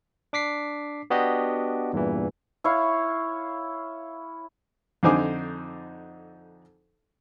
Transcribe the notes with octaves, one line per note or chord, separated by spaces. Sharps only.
D4 D6 B6 C7
B3 D4 F#4 G4 D#5
E2 G2 A#2 E3
E4 C#5 F5
F2 D3 D#4 C5 G#5 D6